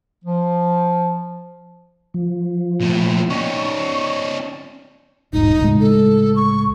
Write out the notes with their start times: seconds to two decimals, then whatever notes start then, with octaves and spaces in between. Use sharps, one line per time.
0.24 F3
2.14 F3
2.80 A#2 A3
3.30 C#4 D#4 C#6
5.33 D#1 B1 G#2 D#4
5.60 C#2 A2 G#3
5.81 A4
6.36 C#6